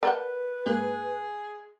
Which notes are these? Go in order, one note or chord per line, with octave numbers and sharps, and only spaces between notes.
A#4 B4 D5 F#5 A5 G6
G#2 A#3 G#4 F#6